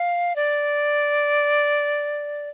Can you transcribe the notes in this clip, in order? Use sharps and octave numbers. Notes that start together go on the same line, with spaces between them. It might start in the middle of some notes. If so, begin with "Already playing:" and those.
Already playing: F5
D5